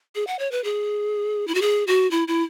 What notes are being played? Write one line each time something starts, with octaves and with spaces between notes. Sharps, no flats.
G#4
F#5
C#5
B4
G#4
E4
F#4
G#4
F#4
E4
E4